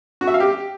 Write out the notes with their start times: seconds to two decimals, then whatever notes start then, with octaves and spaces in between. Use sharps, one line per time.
0.21 F#4
0.27 E5
0.34 F5
0.40 G4